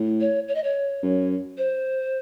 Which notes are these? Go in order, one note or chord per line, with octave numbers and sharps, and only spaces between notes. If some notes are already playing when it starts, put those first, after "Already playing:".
Already playing: A2
C#5
C#5
D#5
C#5
F#2
C5